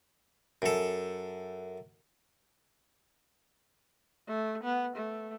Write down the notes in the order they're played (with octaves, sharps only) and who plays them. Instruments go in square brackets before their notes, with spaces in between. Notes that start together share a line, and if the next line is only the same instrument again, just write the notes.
[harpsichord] F#2 A4
[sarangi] A3
B3
A3